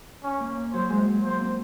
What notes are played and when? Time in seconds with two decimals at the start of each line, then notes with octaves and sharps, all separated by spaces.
0.24 C#4
0.40 A#3
0.73 F#3 C5
0.90 G#3
1.07 F#3
1.23 A#3 C5
1.40 C4